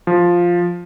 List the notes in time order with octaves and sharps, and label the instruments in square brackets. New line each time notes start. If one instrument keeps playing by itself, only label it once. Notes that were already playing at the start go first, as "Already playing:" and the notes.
[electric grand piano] F3